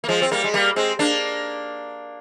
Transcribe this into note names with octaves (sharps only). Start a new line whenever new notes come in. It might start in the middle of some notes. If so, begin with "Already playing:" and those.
A#3
F3 G#3
C4
G3 A#3
G#3
G3 A#3
G#3 C4
A#3 D4